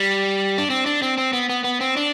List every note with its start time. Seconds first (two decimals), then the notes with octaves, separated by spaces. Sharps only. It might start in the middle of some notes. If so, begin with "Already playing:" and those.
Already playing: G3
0.58 D4
0.70 C4
0.86 D4
1.02 C4
1.18 C4
1.33 B3
1.50 B3
1.64 B3
1.81 C4
1.97 D4